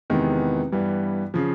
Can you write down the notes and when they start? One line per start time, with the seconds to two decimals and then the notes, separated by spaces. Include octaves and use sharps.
0.10 E2 C3 D#3 G#3 B3
0.72 G2 E3 G3 B3
1.34 C#3 F3